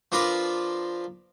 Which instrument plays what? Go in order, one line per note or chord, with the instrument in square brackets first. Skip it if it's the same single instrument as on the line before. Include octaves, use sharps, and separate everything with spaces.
[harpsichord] F3 D4 F4 A#4 B4 D5